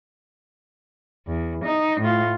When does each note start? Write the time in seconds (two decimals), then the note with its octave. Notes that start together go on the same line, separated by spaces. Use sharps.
1.27 E2
1.64 D#4
2.00 A2 F4